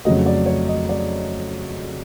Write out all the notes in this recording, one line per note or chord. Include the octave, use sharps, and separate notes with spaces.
F2 C#3 F#3 A3 D#5
D5
C#5
D#5
D5